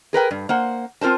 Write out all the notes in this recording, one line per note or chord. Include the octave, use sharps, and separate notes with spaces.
G#4 A#4 B4 G5
G2
A#3 C5 F#5
C4 F4 A#4 C5 A5